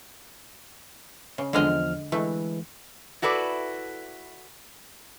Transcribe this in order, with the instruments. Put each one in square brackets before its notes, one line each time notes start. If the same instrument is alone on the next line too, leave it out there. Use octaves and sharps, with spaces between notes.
[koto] C#3
[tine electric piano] E2 F3 F6 [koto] D3 G#3 D#5
[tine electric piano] E3 G#3 [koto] A3
[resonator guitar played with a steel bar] E4 F#4 A4 B4 D5